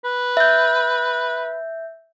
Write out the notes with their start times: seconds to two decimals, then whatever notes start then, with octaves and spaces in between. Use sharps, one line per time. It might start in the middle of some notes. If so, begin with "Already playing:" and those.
0.05 B4
0.37 E5 G6